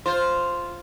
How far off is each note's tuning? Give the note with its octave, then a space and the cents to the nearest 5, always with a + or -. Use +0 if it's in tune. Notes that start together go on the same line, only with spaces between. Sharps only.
F4 +0 C5 +0